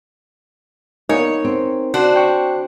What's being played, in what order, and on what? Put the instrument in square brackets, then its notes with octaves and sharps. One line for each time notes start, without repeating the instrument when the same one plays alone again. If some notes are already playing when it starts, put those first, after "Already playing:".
[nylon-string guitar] A#3 B3 [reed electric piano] D#4 A#4 G#5 [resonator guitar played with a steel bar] C#5
[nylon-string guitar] C4
[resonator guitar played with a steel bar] D4 F#4 C5
[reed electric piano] G5 C#6